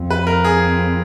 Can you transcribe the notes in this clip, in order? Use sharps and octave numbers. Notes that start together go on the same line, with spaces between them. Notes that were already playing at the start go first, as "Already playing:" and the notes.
Already playing: F2
B4
A#4
G#4